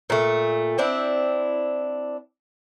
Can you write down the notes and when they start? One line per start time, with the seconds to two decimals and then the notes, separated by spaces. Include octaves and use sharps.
0.10 A#2 A3
0.78 C4 D4 E4